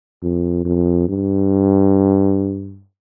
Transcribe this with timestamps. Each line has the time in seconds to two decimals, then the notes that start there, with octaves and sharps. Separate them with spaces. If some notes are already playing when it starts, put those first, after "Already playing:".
0.22 F2
0.65 F2
1.09 G2